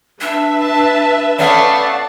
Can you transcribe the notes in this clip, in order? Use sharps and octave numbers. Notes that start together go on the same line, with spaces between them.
D4 B4 E5
A5
A3 B3 C#4 D5 F5 A5